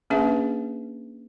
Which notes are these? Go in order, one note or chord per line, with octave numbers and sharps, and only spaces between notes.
A#3 C#4 D4 G#4 B4 E5